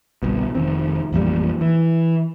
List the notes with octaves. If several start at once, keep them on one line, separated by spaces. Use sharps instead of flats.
G1 C2 B2
F1 D#3 C4
A1 F2 A#2 G3
E3